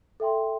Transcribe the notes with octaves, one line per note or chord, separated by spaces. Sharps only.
A4 E5 G5 C6